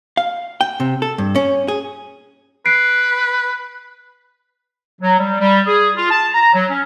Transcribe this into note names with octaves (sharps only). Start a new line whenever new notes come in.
F5
G5
C3
A4
G2
C#4
G#4
B4 F#6 C7 D7
F#3
G3
G3
G#4
F4
A5
A#5
F#3
C#4